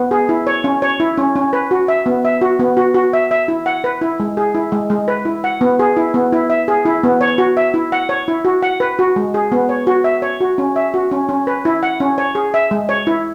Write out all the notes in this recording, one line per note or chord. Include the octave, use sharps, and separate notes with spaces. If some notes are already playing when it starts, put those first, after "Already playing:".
Already playing: B3
G#4
E4
C#5
C#4
C#5
E4
C#4
C#4
B4
F#4
E5
B3
E5
F#4
B3
F#4
F#4
E5
E5
E4
F#5
B4
E4
G#3
G#4
E4
G#3
G#3
B4
E4
F#5
B3
G#4
E4
B3
E4
E5
G#4
E4
B3
C#5
F#4
E5
E4
F#5
C#5
E4
F#4
F#5
B4
F#4
G#3
G#4
B3
C#5
F#4
E5
C#5
F#4
C#4
E5
F#4
C#4
C#4
B4
E4
F#5
C#4
C#5
G#4
E5
G#3
C#5
E4